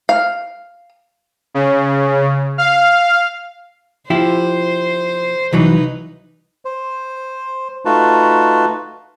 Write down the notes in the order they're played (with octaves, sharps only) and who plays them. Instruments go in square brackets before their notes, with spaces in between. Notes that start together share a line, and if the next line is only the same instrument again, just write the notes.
[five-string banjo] F5
[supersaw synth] C#3
F5
[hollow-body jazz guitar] F3 E4 G4 [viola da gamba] C5
[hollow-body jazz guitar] C2 E3 F#3 [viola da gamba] D#4 B4
[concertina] C5
A3 D#4 F4 F#4 B4 A5